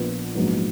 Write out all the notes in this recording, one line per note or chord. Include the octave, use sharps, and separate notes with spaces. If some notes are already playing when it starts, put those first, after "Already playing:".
Already playing: A#1 A#2 F3 B3
A#1 G#2 F#3 B3